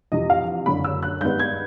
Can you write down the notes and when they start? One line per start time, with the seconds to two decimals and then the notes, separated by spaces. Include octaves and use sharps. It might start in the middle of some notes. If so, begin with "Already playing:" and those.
0.12 F2 C3 E3 D#5
0.30 F5
0.66 F#1 F#2 D3 B5
0.84 E6
1.03 F#6
1.21 G2 D#3 G#3 B3 G6
1.39 G#6